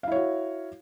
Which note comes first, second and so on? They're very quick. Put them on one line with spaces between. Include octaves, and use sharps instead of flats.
F5 E4 C#5 F#4